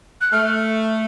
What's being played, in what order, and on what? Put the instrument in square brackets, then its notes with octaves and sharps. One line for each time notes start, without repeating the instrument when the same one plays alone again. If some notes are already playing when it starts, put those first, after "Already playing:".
[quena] F#6
[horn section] A3 [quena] F6